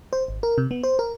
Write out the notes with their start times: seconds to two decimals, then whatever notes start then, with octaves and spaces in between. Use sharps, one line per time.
0.13 C5
0.28 G#1
0.43 A#4
0.58 C3
0.71 B3
0.83 C5
0.99 A#4